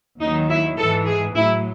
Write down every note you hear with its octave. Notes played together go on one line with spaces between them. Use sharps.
D#2 D#3 F#3 D#4
E4
G#2 E3 A4
G#4
A2 F#3 E4